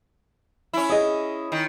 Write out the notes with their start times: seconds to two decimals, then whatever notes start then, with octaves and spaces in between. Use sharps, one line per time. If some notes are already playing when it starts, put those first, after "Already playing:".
0.73 C#4 E4
0.90 G#4 D#5
1.52 D#3